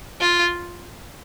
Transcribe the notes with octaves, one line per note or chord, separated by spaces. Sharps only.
F4